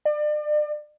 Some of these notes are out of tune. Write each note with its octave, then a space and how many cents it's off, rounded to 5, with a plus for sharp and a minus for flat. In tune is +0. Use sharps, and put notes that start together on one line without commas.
D5 +35